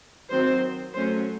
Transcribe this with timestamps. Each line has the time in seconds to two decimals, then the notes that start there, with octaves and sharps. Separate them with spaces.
0.30 D#3 F#3 C4 C5
0.94 F#3 A3 C#4 C5